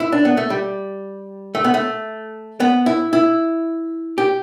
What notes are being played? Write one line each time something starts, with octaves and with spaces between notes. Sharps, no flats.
E4
D4
B3
A3
G3
A3
B3
A3
B3
E4
E4
G4